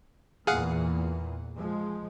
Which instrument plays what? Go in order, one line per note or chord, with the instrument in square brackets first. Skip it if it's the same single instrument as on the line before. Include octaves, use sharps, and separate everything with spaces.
[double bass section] E2 A#2 E3 [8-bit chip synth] G#4 F5 F#5
[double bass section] F3 G#3